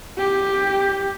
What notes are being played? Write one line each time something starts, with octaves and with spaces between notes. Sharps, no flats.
G4